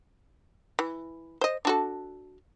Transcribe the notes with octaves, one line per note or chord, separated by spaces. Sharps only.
E3
C5 D#5
D4 F#4 A4